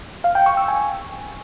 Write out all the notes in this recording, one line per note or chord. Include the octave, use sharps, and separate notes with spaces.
F5
G5
C#6
E6
G#5